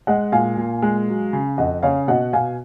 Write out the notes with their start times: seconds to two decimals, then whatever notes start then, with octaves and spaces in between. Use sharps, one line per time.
0.07 G#3 D#5 F#5
0.32 A#2 F5 G#5
0.57 A#2
0.82 G#3
1.08 F#3
1.33 C#3
1.58 F2 D#5 F#5
1.83 C#3 C#5 F5
2.08 B2 D#5 F#5
2.33 B2 F5 G#5